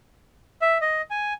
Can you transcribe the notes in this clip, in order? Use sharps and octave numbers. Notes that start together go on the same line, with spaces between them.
E5
D#5
G#5